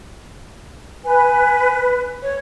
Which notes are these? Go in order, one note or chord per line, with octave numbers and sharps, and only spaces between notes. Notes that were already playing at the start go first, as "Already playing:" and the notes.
B4 G#5
C#5